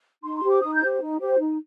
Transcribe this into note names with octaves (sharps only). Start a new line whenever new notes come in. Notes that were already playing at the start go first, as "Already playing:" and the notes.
D#4 C6
C6
G4 C5
D6
D#4 D#6
G6
G4 C5
D#4
G4 C5
D#4